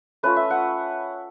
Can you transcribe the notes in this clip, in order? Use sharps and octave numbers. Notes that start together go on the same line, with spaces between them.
A3 C#4 F4 B4
E5
F#5